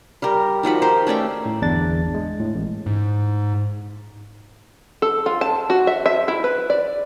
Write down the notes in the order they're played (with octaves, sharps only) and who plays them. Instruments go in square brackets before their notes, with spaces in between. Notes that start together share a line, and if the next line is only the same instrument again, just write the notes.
[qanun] G3 G4 A#4
D#3 F3 F#4 B5
G4 A#4 C5
A3 C#4 D5 G5
[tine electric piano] A2
G1 E2 D4 A6
G#3
A2
A1
[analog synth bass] G#2
[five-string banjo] A4
F4
A5
F#4
E5
E5
E4
B4
D5